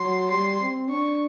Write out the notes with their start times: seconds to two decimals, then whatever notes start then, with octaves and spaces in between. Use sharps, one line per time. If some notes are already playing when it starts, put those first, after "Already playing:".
Already playing: F#3 C6
0.30 G3 C6
0.61 C4
0.90 D4 C#6